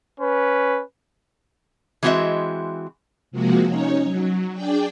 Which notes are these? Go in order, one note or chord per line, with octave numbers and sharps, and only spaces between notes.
C#4 B4
E3 G#3 C4 F#4 D#5 E5
C3 F3 G#3 A#3 F#4
C#4 D#4 C#5
F#3
D4 G#4 D5 G5